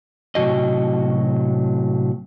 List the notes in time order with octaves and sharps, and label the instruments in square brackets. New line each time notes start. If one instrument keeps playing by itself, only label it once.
[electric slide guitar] A2 C3 F#3 F#4 D#5